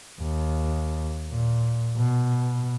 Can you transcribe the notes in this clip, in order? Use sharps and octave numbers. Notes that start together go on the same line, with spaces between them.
D#2
A#2
B2